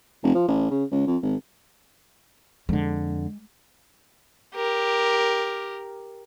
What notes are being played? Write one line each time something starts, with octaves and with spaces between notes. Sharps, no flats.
F1
F3
A1
C#3
C#2
F2
G#1
F2 D3 G#3
G4 A#4